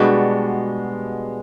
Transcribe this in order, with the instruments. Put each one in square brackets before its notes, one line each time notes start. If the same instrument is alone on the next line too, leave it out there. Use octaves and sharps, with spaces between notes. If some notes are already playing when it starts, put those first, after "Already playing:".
Already playing: [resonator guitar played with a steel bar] B2 G3 B3 D4 F#4 [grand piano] G#3